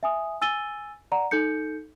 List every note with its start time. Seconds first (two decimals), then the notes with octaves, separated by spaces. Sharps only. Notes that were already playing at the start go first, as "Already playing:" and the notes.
0.03 E5 G#5 D#6
0.41 G#5 E6 A6 D#7 G7
1.12 D5 F#5 A#5
1.31 D#4 A4 G6 C#7